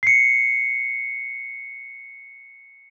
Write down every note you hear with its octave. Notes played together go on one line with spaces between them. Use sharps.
C7 C#7